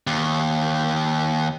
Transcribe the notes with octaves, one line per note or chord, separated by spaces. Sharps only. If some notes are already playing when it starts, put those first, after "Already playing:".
D#2